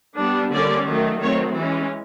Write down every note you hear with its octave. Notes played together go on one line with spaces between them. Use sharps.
G3 B3 D4
D3 G3 A#3 C#4 D5
D#3 F#3 A3
D#3 F#3 A3 C4 C#5
E3 G#3 C#4